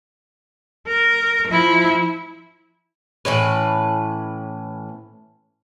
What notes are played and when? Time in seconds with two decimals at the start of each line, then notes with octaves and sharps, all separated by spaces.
0.87 A#4
1.48 F3 E4
3.25 A2 E3 C#4 B4